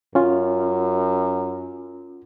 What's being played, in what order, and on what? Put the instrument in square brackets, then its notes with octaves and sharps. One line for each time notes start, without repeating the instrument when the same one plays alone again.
[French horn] F#2 [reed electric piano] C#4 F4